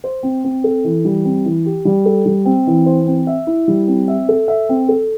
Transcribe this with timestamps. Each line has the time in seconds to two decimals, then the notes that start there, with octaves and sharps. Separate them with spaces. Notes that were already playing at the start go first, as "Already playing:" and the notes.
0.04 C5
0.23 C4
0.44 C4
0.64 A4
0.84 E3
1.05 G3
1.25 C4
1.45 E3
1.66 G4
1.85 G3
2.06 A4
2.26 G3
2.45 C4
2.67 E3
2.86 C5
3.07 C4
3.27 E5
3.47 E4
3.68 G3
3.88 C4
4.08 E5
4.29 A4
4.48 E5
4.69 C4
4.89 A4